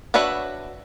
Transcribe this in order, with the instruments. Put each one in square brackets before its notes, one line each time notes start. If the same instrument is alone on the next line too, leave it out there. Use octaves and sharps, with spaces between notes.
[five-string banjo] D4 F#4 B4 C#5 E5